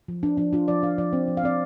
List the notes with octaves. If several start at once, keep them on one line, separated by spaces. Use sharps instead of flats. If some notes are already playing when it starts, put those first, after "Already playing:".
F3
D4
F3 D4
D4 F4
F3 D5
D4 F5
F3 D5
C4
F3
F5
C4 D5